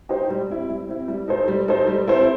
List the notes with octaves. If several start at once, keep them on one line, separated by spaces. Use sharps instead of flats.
D#4 G4 C5
G3
C4 E4
G3
C4 E4
G3
D#4 A4 C5
G3
D#4 A4 C5
G3
C4 E4 A4 C5